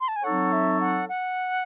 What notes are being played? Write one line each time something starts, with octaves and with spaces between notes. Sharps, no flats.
C6
A5
G#5
F#3 C4 D#4 A4 C#5 F#5
E5
F#5
F#5